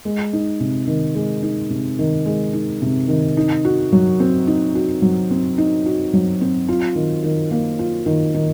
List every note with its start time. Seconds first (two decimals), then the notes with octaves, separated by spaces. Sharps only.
0.05 G#3
0.33 D#4
0.60 C3
0.88 D#3
1.15 G#3
1.43 D#4
1.70 C3
1.99 D#3
2.26 G#3
2.53 D#4
2.82 C3
3.08 D#3
3.37 D#4
3.65 F#4
3.92 F#3
4.20 C4
4.47 D#4
4.75 F#4
5.02 F#3
5.31 C4
5.58 D#4
5.86 F#4
6.13 F#3
6.41 C4
6.68 F4
6.95 D#3
7.24 D#3
7.51 A#3
7.79 F4
8.06 D#3
8.34 D#3